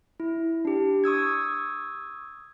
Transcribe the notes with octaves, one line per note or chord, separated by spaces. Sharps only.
E4
D4 G4
C#6 D#6 E6 G#6